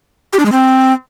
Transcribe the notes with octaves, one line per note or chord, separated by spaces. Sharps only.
G4
D4
G#3
C4